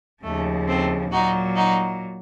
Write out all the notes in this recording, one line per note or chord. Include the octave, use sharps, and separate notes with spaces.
D#2 C#3 F3 A3
A3 C4
A#2 F#3 D#4 F#4
D#4 F#4